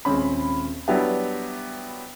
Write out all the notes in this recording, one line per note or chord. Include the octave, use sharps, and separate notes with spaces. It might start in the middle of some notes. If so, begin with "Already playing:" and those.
D#1 G#3 C4 C#4 B5
F#3 G3 B3 D4 E4 G4